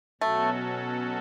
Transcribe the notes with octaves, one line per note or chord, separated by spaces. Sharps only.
B2 F#3 A3 C#4 F#4 A4